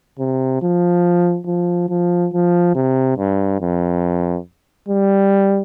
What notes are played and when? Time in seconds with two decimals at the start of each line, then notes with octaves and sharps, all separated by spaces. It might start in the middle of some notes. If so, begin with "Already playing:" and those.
0.19 C3
0.62 F3
1.47 F3
1.90 F3
2.33 F3
2.75 C3
3.18 G2
3.61 F2
4.89 G3